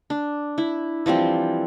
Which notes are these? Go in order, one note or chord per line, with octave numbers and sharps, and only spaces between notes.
D4
E4
E3 F3 G3 C4